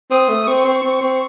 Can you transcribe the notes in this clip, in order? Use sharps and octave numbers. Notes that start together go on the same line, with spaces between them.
C4 D#6
A3
C4 C#6
C4
C4
C4